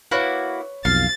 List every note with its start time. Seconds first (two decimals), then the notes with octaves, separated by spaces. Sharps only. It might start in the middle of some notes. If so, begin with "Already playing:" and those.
0.11 A#3 E4 F#4 B4 C#5
0.85 B1 F2 F5 A6